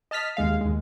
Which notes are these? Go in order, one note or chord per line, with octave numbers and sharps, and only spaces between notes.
D#5 A5 F6 B6
D#2 G#3 F5
D#2 G#3